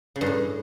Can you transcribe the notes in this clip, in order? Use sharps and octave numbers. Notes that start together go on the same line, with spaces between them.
C#3
G2
A2